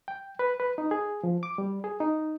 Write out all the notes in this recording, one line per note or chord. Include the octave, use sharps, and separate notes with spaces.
G5
B4
B4
D#4
G#4
F3
D6
G3
G#4
D#4